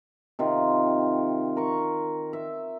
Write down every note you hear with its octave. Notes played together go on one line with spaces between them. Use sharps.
C3 D#3 F4
A#4 C#6
E5